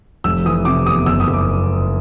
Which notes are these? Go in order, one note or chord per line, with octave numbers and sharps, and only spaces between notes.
F1 E6
E3 D#6
C3 D6
E2 D#6
F#1 E6
D#6
F#1
D6